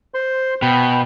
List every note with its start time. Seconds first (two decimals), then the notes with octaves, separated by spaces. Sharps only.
0.14 C5 C6
0.62 B2 G5 B5